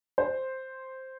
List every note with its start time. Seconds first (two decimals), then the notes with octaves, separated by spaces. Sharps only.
0.18 C5